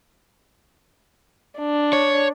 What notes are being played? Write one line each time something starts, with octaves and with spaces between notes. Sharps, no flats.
D4
C#5